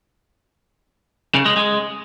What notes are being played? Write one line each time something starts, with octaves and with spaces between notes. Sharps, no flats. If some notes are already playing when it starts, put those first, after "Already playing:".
C#3
G#3
G#3